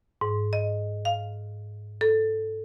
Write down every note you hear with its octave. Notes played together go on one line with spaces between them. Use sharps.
G#2
D#5
F5
A4